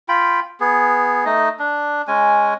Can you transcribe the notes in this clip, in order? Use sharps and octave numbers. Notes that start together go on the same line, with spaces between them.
F4 G5 B5
B3 G#4
A3 D#4 D#5
D4
G#3 C#4 G#5